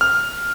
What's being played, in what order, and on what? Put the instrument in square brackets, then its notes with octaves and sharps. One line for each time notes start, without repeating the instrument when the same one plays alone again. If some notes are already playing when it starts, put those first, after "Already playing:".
[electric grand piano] F6